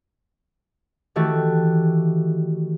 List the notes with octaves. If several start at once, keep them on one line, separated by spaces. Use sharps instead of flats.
D#3 E3 A3 F#4 G4